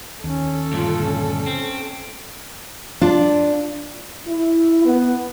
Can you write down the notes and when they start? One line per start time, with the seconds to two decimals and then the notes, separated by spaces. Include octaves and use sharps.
0.24 D#2 C#4 A4
0.72 D2 G2 A#2 F4
1.04 C#4
1.46 C4
3.01 D4 F4
4.26 E4
4.85 B3